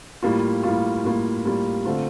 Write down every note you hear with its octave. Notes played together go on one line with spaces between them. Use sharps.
A2 G3 A#3 F4
A2 G3 A#3 F4
A2 G3 A#3 F4
A2 G3 A#3 F4
D3 A3 C4 F4